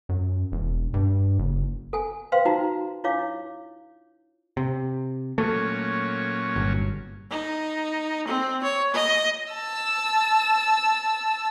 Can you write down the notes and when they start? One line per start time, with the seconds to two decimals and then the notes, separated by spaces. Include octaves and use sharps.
0.09 F#2
0.52 E1
0.94 G2
1.39 F#1
1.93 A4 G#5
2.32 B4 C5 F5 G5 C6
2.45 D#4 F4 F#4 G5 A#5
3.04 D4 E4 F4 C#5 F5 D6
4.57 C3
5.38 A#2 F#3 A3 C#4
6.56 G1
7.31 D#4
8.28 C4
8.63 C#5
8.94 D#5
9.53 A5 E6